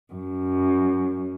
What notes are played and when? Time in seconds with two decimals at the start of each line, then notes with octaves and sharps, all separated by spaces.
0.14 F#2